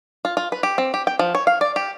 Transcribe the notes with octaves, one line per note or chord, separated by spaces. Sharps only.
F4
F4
B4
G4
C4
G4
G5
F3
C#5
F5
D5
G4